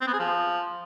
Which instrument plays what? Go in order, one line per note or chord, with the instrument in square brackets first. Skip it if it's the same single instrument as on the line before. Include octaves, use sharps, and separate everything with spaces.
[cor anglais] C4
B3
G#4
F3